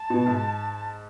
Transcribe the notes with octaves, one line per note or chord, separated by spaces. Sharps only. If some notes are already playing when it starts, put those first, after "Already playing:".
Already playing: A5
B2
G#2